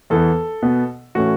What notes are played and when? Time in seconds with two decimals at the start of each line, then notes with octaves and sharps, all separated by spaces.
0.10 E2 E3 B3 A4
0.63 B2 B3
1.15 A2 E3 A3 C#4 F#4